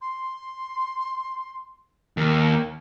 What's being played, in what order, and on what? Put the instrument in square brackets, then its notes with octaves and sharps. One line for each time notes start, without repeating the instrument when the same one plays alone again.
[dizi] C6
[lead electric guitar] D#2 [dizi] A#4